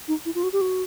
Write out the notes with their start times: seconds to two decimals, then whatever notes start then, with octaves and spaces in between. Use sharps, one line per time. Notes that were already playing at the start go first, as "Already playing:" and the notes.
0.08 D#4
0.26 E4
0.35 F4
0.43 F#4
0.53 G4
0.61 F#4